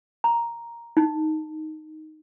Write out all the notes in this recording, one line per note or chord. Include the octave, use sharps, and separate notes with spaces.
A#5
D#4